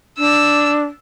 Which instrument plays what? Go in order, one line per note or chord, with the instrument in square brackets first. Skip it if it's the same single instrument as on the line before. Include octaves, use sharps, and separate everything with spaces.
[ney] D4 [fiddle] E6